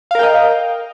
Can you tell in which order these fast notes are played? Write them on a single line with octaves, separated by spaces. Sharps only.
F5 A#4 G5 D#5